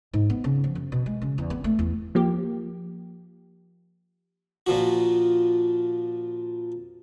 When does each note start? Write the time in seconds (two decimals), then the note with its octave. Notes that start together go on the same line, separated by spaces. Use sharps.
0.13 G#2
0.30 B3
0.44 C#3
0.64 F3
0.75 F#2
0.92 B2
1.06 G#3
1.22 C#3
1.38 E2
1.50 B3
1.64 A3
1.79 E2
2.15 F3 A#3 G4
4.67 A#2 F3 F#4